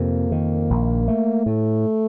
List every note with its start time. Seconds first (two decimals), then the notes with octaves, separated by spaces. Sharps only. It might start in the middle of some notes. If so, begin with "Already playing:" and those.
Already playing: F2 C3 A#3
0.32 D#3
0.70 A#1
1.08 A3
1.46 A2 A3